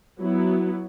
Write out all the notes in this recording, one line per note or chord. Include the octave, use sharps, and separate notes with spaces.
F#3 B3 E4